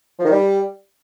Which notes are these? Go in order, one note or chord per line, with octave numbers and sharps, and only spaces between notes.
F3
D#3
G3